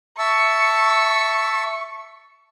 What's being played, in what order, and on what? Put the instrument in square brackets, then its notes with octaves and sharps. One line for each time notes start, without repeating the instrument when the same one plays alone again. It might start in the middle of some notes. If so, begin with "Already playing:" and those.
[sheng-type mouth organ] E5 A5 E6 [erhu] C#6